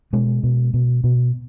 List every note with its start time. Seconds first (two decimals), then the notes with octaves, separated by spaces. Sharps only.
0.13 B2 G#3
0.43 B2
0.74 B2
1.04 B2